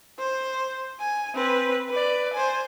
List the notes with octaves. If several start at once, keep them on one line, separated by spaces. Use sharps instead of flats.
C5
G#5
C4 B4
B4 D5
C5 G#5